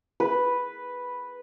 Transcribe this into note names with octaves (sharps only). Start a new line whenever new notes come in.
B4